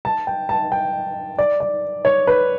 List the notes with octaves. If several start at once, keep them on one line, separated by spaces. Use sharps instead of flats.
A5
G5
A5
G5
D5
D5
C#5
B4